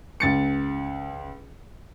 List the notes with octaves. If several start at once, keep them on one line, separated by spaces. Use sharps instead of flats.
C#2 A6 C#7